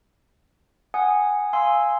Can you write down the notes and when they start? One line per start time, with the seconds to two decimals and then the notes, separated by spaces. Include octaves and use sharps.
0.94 F#5 G#5 D#6
1.53 F5 G#5 C6 E6